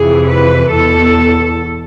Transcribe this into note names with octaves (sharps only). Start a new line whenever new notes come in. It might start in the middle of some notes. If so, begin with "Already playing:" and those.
Already playing: F2 C3 E3 G#4
B4
E2 B2 A4